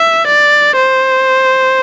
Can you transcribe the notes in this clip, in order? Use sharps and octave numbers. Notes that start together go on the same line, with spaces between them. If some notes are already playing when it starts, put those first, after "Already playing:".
Already playing: E5
D5
C5